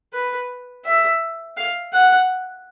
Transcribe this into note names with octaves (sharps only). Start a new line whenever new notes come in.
B4
E5
F5
F#5